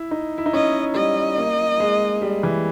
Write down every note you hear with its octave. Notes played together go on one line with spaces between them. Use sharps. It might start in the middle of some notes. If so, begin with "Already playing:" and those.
Already playing: E4
D#4
E4
D#4
C#4 D#5
G3 D#5
A#3
G#3
G3
E3